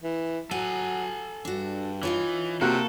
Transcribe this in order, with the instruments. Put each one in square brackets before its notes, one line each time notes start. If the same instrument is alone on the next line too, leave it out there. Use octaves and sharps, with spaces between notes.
[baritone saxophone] E3
[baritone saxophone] F#3 [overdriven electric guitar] A4 G#5 [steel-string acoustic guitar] F#5
[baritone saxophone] G2 [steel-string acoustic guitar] D4 F#4
[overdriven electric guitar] E3 [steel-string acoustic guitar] D#4 F4 C#5
[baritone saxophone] C3 [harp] A#3 F#4 [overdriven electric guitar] A4